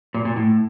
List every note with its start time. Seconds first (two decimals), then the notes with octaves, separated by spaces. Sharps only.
0.14 A#2
0.25 A#2
0.36 A2